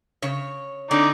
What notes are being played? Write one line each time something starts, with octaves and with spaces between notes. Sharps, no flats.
C#3 C#5
D3 C4 D#4 D5